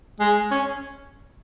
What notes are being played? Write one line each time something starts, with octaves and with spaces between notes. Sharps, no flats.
G#3
C#4